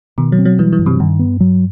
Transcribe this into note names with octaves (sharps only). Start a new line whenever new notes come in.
B2 D#3
F#3
C4
F#3
E3 G3
E3
G2
C3
G2 D#3
B3
F#3